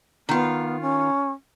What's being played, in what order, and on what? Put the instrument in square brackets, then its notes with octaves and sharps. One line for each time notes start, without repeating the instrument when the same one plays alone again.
[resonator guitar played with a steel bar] D#3 F4 [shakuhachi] B3
[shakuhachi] C#4